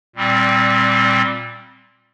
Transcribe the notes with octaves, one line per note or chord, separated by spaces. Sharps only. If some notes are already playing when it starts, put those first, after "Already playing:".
A#2 G3 C4